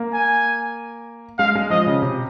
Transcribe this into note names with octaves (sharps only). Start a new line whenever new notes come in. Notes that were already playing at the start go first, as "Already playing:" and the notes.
Already playing: A#3
G#5
G#3 F5
G#3
F3 D#5
C#3
C3